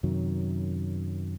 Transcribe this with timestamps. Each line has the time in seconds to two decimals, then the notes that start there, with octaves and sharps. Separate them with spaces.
0.03 F#2 C3 D#3 F#3